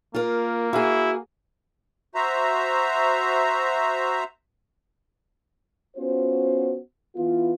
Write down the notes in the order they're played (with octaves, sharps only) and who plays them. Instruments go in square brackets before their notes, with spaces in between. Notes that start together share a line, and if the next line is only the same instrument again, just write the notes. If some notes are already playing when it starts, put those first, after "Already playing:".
[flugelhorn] A#3 [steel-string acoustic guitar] F4 A#4
[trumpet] E4 [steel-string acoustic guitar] F#4 G#4
[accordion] F#4 C5 E5 A#5
[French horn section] B3 C#4 F4 F#4 C5
E3 B3 E4 F4